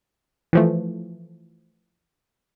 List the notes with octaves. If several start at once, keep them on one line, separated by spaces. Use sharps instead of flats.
E3 F3 A3